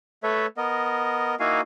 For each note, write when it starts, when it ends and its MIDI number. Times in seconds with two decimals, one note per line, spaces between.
0.23 0.46 57
0.23 0.46 69
0.23 0.46 71
0.23 0.46 73
0.23 0.46 76
0.57 1.35 59
0.57 1.35 70
0.57 1.35 75
1.40 1.61 58
1.40 1.61 63
1.40 1.61 64
1.40 1.61 66
1.40 1.61 77
1.40 1.61 80